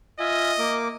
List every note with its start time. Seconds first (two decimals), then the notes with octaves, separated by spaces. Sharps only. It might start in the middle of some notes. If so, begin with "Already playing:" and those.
0.20 F4 D#5 E5 G#5
0.59 A#3 D6